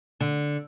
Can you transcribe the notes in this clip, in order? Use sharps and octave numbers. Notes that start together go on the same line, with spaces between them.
D3